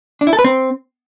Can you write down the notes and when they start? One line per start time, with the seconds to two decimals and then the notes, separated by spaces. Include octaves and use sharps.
0.21 D4
0.27 E4
0.33 A4
0.39 B4
0.44 C4